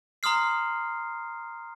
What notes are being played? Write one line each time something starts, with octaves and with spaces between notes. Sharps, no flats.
A#5 C6 D#6 F6 C7